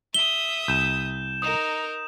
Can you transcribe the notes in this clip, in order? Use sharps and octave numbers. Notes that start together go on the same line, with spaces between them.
E5 D#6 G7
C2 G6 E7
D#4 A#4 D#6 E7